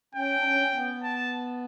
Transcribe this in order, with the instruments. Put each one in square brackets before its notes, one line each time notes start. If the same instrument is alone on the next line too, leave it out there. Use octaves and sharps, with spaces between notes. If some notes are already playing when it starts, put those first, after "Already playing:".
[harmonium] C#4 [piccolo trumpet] G5
[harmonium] D4
C#4
C#4
B3
[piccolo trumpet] A5